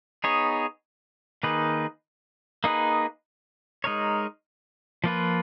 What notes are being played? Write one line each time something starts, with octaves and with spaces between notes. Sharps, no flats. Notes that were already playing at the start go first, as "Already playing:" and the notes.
B3 D#4 G#4 C#5
D#3 A#3 D#4 G#4 B4
A#3 D#4 G#4 B4
G#3 D#4 A#4 C#5
F3 A#3 F4 B4